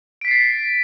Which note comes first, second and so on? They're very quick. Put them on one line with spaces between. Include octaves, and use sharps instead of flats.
D7 B6 C7 A6